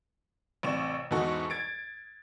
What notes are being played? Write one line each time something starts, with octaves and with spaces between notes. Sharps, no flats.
A1 C3 D5 C#6 E7
E2 G#2 D#4 F#4 A4 C#6
G#6 A6 D7